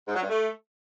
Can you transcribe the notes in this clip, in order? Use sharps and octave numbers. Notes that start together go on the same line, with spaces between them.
G#2
F#3
G2
A3